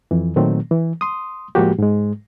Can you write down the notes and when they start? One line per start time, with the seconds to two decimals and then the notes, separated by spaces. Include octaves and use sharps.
0.11 F2 E3
0.36 A#2 D#3 F#3 A3 C4
0.71 E3
1.01 C6 D#6
1.55 A2 F3 G#3 A#3 F#4 G4
1.79 G#2 G#3